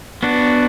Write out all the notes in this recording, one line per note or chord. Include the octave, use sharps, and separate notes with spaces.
B3 D4 F#4